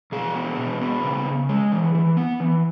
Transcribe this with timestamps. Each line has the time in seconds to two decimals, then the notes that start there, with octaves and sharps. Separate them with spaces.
0.12 B2 G#4
0.35 B3
0.58 B2
0.81 B3
1.04 C#3
1.26 C#3
1.49 G#3
1.72 E3
1.95 E3
2.17 B3
2.40 E3